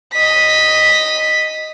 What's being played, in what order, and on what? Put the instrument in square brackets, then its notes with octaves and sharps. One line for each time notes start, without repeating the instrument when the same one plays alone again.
[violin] D#5 B6